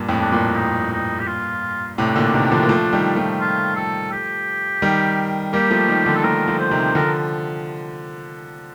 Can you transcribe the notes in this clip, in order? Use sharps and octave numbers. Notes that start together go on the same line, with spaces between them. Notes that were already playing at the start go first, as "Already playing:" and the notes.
Already playing: G2 A#2
F2 A2
D4
G2 A#2
D#4
D#4
G4
F4
A2 C3 D4
A#2 D3
C3 D#3
D3 F3
A#3
F3 A3
D#3 G3
F3 A3
F4
A4
G4
D#3 G3
G3 A#3 G4
F3 A3
D#3 G3
D3 F3
A4
F3 A3 A#4
D3 F3
C5
C3 D#3
D3 F3 A#4